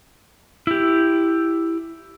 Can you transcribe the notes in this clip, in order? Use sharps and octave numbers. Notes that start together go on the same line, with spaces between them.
E4 G4